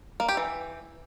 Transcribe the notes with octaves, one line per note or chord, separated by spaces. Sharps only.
A#3
G4
E3